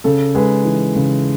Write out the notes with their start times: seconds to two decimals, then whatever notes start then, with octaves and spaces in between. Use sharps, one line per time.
0.04 C#3 A4
0.35 G#3 G#4 B4
0.65 E3
0.96 C#3